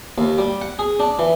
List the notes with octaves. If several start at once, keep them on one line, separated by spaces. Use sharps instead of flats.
D#2
G3
F#5
G#4
D4
E3